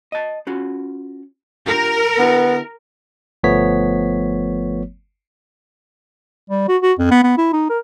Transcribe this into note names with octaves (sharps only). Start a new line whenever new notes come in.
D#5 A5
C#4 F4 F#4
D4 F4 G4 A#4
D3 B3 E4 G4
G1 F3 A3 B3 C#5 B6
G3
F#4
F#4
F2
B3
B3
E4
D#4
A#4